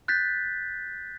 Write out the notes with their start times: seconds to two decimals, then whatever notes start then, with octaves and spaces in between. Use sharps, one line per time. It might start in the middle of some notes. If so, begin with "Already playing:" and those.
0.08 F#6 G6 A6 B6